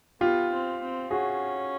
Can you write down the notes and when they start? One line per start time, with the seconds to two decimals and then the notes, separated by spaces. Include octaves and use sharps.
0.21 B3 F4 G4
0.51 C4
0.81 C4
1.11 C#4 F#4 G#4